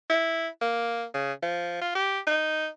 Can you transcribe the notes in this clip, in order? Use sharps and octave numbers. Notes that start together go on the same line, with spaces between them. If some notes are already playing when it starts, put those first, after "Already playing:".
E4
A#3
C#3
F3
F4
G4
D#4